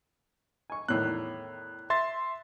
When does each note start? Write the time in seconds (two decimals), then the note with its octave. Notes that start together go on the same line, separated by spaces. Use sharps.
0.70 G#5 C#6
0.88 E2 A2 D#3 F#6
1.90 E5 C6 A6